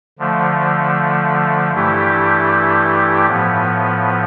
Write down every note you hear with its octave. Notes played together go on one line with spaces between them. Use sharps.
D3 F3 A3
G2 E3 A3 E4 G4
A2 F3 B3